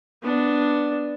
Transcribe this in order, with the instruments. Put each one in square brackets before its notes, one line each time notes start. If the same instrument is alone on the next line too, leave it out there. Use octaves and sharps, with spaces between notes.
[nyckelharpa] B3 D4